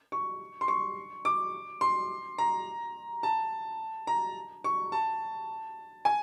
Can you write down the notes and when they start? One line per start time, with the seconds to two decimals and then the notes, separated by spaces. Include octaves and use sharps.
0.12 C#6
0.61 C6
0.68 C#6
1.25 D6
1.81 C6
2.38 A#5
3.23 A5
4.07 A#5
4.64 C#6
4.92 A5
6.05 G#5